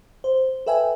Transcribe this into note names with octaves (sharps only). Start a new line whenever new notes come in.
C5
A4 B4 E5 G5 G#5